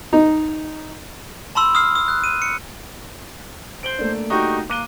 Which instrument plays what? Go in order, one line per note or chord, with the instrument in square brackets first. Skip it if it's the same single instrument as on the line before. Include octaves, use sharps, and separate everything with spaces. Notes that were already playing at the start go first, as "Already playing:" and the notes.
[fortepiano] D#4
[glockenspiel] A5 B5 C6 E6
D#6 F6 C7
D#6
F#6
D#7
C#7
[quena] C5 [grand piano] D7 F#7 G7
[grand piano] A3 A#3 D4
[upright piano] D#4 F#4 G4 [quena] C#6
[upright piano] A#3 [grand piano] D6 D#7 G7 [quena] F#6